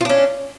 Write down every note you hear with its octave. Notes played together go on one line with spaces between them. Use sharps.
C#4 D4 F4